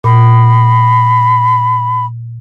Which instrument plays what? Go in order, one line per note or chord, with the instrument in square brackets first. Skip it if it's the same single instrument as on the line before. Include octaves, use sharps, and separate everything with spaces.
[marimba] A#2 [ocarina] B5